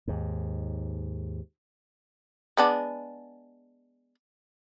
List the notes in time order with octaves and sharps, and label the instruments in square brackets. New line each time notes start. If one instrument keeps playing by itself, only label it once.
[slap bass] D#2 G#2
[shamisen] G#3 B3 D4